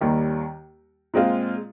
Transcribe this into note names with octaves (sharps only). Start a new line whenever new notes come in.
D#2 D#3 G3 A#3
A#2 G#3 C4 F4